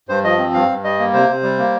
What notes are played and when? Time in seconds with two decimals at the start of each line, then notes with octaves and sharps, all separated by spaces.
0.09 G2 C5
0.24 F3 D#5
0.38 C4
0.53 G2 F5
0.68 G2
0.84 G3 D#5
0.99 A#3
1.14 C3 C5
1.29 C3
1.43 G3
1.58 A#3